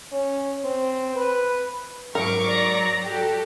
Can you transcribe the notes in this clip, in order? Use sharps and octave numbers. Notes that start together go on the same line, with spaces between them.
C#4
C4
B4
G#2 F#3 A#4 C#6 D6
D5 A#5
F#4 G4 A4